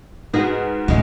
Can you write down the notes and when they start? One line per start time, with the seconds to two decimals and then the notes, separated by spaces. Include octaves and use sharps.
0.34 G#2 F#4 G#4 B4 D#5
0.88 A2 C#3 G#3